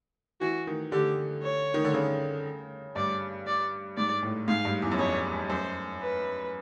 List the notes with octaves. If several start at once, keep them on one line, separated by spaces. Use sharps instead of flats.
E3 F#4
D#3
D3 G4
C#5
D#3
D3
C#3
G2 D5
D5
G#2 D5
A2
G#2 F5
G2
E2
F#2
F2 C#5
F#2 C5
B4